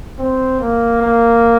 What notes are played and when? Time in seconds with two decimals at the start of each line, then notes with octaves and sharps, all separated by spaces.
0.19 C4
0.60 A#3
1.02 A#3